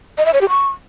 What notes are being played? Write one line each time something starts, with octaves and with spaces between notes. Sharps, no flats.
D#5
E5
C#5
G4
C#6